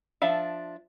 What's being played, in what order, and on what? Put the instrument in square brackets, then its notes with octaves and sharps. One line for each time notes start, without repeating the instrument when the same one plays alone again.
[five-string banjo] F3 D4 E5 F5